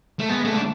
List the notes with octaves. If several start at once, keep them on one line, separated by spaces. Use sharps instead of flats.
A3
G#3 B3
A3
D4